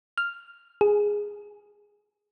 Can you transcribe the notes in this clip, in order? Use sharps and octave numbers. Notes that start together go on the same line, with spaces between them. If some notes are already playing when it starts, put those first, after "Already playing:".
F6
G#4